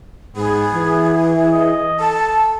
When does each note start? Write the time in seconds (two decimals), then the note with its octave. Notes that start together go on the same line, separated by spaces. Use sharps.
0.36 G#2 B3 G#4
0.75 E3
1.52 D#5
2.00 A4 A5